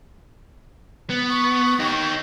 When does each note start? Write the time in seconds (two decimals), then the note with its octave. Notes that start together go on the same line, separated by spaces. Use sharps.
1.10 B3
1.30 C#6
1.80 D#4 G4